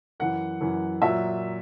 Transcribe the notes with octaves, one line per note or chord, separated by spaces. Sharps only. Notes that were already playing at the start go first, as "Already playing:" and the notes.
F#2 E3 F#5
F#2 E3
A#2 F#3 E5